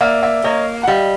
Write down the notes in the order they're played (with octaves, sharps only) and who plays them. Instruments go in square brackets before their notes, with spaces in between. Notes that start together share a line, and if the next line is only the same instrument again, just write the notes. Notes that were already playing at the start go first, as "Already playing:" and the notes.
[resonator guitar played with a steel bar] A#3 [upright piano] D5 E5
[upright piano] D5 E5
[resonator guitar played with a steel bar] A#3 [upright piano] C#5 D#5
[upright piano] F#5
[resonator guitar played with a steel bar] G3 [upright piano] D#5 F5